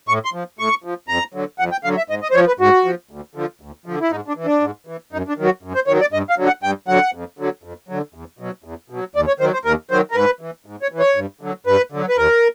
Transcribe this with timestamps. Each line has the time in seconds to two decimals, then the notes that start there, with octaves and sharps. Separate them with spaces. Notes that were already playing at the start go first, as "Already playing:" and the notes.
0.08 A2 C#6
0.25 C6
0.33 F3
0.59 A2 C#6
0.84 F3
1.08 F2 A#5
1.34 D3 F#3
1.59 F2 F#5
1.72 G5
1.84 D3 F#3 F5
1.97 E5
2.09 G#2 D#5
2.23 D#5
2.31 C5
2.35 F3 C#5
2.47 B4
2.60 G#2 F#4
2.85 F3
3.11 D2
3.35 D3 F3
3.61 D2
3.86 D3 F3
4.01 E4
4.11 G#2 D#4
4.28 D4
4.36 E3
4.45 D4
4.61 G#2
4.87 E3
5.13 F#2 D#4
5.28 D4
5.38 D#3 F#3
5.45 F#4
5.63 F#2
5.75 C5
5.87 D#3 F#3 C#5
6.01 D5
6.12 G2 D#5
6.30 F5
6.38 D3 F#3
6.47 F#5
6.63 G2 G5
6.88 D3 F#3 F#5
7.14 F2
7.39 D3 F#3
7.63 F2
7.89 D3 F#3
8.14 E2
8.39 B2 F#3
8.64 E2
8.90 B2 F#3
9.15 D#2 D5
9.27 C#5
9.40 D#3 F#3 C5
9.53 C5
9.65 D#2 A#4
9.91 D#3 F#3 C5
10.11 A#4
10.15 G#2 B4
10.41 E3
10.66 G#2
10.82 C#5
10.92 E3
10.99 C#5
11.16 G2
11.41 D3 F#3
11.66 G2 B4
11.92 D3 F#3
12.09 B4
12.17 D#2 A#4